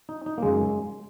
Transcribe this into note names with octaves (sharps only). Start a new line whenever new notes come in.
D#4
D#4
A#3
F#2 C#3 G#3